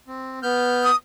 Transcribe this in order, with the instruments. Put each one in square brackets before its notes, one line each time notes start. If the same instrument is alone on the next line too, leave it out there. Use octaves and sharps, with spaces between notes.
[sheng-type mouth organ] C4
B3 F6 G6
[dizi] D#6